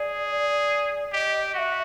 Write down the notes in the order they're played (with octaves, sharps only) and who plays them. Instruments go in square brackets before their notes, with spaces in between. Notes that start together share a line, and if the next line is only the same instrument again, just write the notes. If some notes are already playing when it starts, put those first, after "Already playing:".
Already playing: [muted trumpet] G#4 [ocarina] D5
[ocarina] D5
[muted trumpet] G4 [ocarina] D#5
[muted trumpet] F#4 [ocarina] E5 F#5